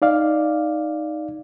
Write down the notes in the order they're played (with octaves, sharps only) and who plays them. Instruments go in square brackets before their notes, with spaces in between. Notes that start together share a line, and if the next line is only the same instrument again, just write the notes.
[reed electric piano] D#4 D5 F5